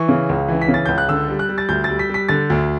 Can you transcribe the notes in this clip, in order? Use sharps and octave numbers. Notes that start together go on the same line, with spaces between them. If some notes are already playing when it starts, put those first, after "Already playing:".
Already playing: E3 C#6
C#3
C#2
E3
B6
C#3
A6
C#2 G6
F#6
D3 E6
G3
F#6
G3
A6
D2 G6
G3 A6
B6
G3 B6
D3 A6
D2